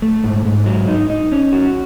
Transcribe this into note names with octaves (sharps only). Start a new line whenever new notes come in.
A3
G#2
G#2
F#3
D#4
D#4
C#4
F#4